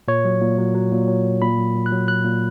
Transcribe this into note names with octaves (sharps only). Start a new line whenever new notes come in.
A#2 C#5
F#3
A#2
F#3
F#3
A#2
F#3
A#2
A#2 B5
F#3
F#3
F#6
F#3
F#3 F#6
A#2